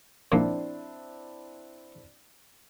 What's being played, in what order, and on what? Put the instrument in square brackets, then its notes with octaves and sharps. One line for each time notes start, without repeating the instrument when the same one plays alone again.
[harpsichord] A#2 F3 A#3 [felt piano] C4 D4 E4